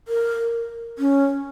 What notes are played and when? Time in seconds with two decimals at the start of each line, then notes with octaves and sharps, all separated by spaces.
0.08 A#4
0.99 C#4